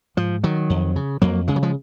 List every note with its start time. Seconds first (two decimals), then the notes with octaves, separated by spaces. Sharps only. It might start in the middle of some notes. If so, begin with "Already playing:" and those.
0.17 G#2 F3
0.44 D#3 F#3
0.70 F2
0.96 C#3
1.22 F2 F#3 A#3
1.48 C#3 G#3
1.56 F#3
1.63 F3 G#3